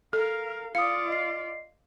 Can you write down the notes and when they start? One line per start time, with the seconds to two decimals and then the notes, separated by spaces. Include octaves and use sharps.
0.13 A4 A#4 F5
0.75 F4 D5 F5 D#6 C#7
1.08 D#5 C7